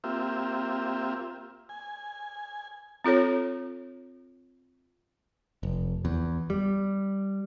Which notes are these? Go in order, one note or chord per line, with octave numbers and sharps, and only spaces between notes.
A#3 C4 F4 G4 E5
G#5
C4 F4 A4 C#5
F1
E2
G3